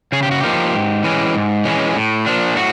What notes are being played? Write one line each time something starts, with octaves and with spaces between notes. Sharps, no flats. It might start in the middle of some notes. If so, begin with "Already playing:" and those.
C#3 G#4
G4
F#4
F3 A#3 D#4 G4
G#2
E3 G#3 C#4
G#2
E3 G#3 C#4
A2
F3 A#3 D4
A2 F#4